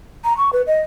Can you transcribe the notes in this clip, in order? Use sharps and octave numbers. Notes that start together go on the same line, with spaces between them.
A#5
C#6
B4
D#5